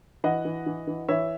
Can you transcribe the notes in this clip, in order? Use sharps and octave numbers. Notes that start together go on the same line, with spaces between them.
E3 D#5 F#5
E3
E3
E3
E3 C#5 E5